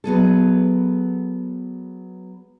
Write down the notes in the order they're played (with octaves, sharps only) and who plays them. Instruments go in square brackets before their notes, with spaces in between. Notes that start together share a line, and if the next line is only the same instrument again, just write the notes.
[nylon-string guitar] F#3 B3 G#4 A4